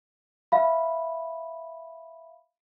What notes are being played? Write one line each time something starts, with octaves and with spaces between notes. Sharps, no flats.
E5 F5 B5